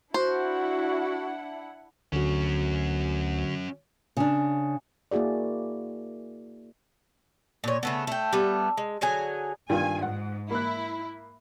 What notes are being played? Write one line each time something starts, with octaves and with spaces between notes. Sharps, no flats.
D4 E4 F#4 C5 F#5
D2 D3 F#3 C#4 F#4
C#3 D4
A#3 E4 F#4 G#4 D5
A#2 C#5
C#3 A3 B3
A3 G5
G3 A3 B3
G#3
D3 F#3 G#4 G#5
G2 D#3 F4 G#5
G#2 F#5
A#3 E4 F#6